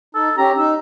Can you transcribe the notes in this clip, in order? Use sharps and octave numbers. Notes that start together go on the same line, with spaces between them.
D#4 A4
C#4 G4 A#5
D#4 E6